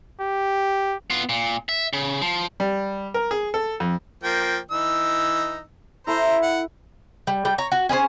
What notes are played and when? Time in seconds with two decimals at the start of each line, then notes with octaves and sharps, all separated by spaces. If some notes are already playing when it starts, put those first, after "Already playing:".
0.21 G4
1.10 B3 F4
1.29 A#2
1.69 E5
1.93 C#3
2.22 F3
2.60 G3
3.14 A#4
3.31 G#4
3.54 A4
3.80 F2
4.23 F3 A#3 G5
4.71 E3 D#4 E6
6.07 E4 A4 C5 A#5
6.42 F#5
7.27 G3
7.45 G3 G5
7.58 C#5 A#5
7.72 F#4
7.89 C#4 G#4 B4 C5